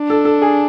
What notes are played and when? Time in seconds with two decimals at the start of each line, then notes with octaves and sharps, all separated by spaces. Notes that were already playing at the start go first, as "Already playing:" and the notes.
Already playing: D4
0.10 A4
0.25 A4
0.42 G#4